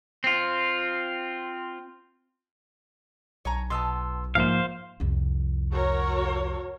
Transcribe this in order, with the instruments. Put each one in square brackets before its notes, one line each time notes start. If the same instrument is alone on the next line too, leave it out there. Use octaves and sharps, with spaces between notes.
[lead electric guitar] C4 F4
[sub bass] B1 [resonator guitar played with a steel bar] C#5 G#5 A#5
[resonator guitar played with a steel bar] B2 B3 A5 [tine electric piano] C6 E6
[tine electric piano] G#2 F3 A#3 [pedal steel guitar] C5 F5 [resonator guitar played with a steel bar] E5
[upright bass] C2 F2
[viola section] F#4 A#4 C#5